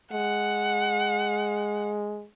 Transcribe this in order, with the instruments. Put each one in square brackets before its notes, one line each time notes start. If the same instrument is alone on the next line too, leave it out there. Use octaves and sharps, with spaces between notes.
[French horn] G#3 [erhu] F#5